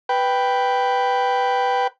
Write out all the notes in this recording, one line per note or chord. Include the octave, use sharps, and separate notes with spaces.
B4 G5